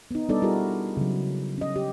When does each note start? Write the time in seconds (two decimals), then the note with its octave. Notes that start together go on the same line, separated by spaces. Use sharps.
0.11 B3 D#4
0.29 G3 B3 D4 D#4 A4 D5
0.42 G3 E4 F#4 G#4 A#4
0.97 C#3 F#3
1.58 C#4 D#5
1.76 G4